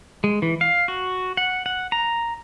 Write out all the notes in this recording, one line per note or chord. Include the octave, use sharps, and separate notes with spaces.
G#3
E3
F5
F#4
F#5
F#5
A#5